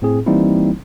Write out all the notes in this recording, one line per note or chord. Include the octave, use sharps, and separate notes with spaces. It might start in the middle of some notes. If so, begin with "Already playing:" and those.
A2 C4 G#4
E3 G3 A#3 C4 D#4 E4